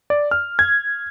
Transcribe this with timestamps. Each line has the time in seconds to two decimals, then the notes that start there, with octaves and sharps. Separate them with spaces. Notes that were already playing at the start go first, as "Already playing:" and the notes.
0.10 D5
0.31 F6
0.59 G#6